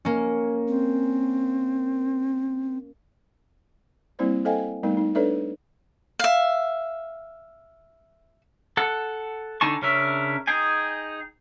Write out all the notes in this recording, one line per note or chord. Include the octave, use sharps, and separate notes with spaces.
A#3 C#4
C4
G3 A#3 C4 E4 C5 D5
A4 C5 D#5 F5 G5 G#5
G3 A3 B3 D#4 A#4
D#4
D4 A4 B4 C#5 D5 E5
E5 F5
A4 F#5
D3 D#4 G#5 A5 C#6
C#3 C#4 D4 A#4 E5
D#4 G#4 G5 G#5